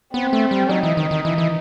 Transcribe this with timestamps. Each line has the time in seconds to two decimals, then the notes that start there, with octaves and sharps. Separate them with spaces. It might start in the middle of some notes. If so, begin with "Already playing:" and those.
0.14 B3 C4
0.33 A3
0.51 G3
0.69 F#3 D#4
0.83 E3
0.97 D#3
1.11 D#3
1.25 E3
1.38 E3